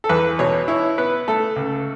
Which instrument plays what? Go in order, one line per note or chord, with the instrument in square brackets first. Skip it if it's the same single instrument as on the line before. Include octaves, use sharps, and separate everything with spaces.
[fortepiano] A4
E2 B4
B2 C#5
E4 C#5
B3 B4
A3 A4
C#2